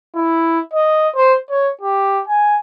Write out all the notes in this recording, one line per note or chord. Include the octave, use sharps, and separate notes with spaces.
E4
D#5
C5
C#5
G4
G#5